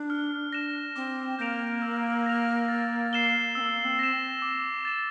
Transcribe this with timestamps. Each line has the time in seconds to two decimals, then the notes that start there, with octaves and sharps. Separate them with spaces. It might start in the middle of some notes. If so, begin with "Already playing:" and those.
Already playing: D4
0.10 F6
0.53 A#6 E7
0.96 C4 D6
1.39 A#3 G6 A#6 D7 F7
1.82 E6
2.26 A#6 F7
2.68 A6
3.13 C7 E7 G7
3.55 C4 E6
3.60 A#3
3.85 C4
3.99 A#6 E7
4.42 D6
4.85 A6 E7